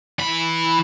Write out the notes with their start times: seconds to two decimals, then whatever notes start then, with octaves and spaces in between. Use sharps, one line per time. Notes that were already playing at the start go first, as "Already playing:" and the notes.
0.19 E3 B5